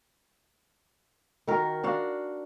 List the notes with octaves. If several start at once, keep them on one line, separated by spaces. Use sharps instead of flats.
D#3 F#4 A#4
D4 F#4 F5